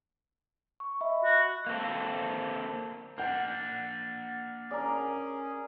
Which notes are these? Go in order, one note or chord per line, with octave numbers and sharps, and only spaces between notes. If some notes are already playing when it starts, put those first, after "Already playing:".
C#6
D#5 E5 B5
F#4
A#3 C4 A4
A#3 D4 F#5 G6
C#4 G#4 A#4 D5